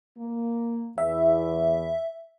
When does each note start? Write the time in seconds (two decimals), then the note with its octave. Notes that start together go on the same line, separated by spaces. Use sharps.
0.18 A#3
0.98 E2 E5